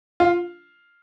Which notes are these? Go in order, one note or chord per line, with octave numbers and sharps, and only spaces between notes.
F4